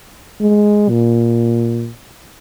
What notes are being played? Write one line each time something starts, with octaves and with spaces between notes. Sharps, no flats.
G#3
A#2